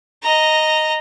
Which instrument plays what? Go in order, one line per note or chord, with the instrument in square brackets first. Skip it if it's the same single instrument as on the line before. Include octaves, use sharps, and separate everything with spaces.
[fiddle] D#5 A#5